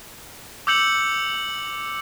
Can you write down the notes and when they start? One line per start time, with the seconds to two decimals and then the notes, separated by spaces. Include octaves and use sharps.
0.67 D6 E6 G6 C#7 F#7